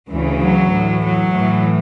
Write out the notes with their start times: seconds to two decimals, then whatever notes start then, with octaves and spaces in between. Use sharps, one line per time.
0.11 D2 C#3 E3
0.42 F#3
0.72 A2 E3
1.02 F#3
1.32 A2 E3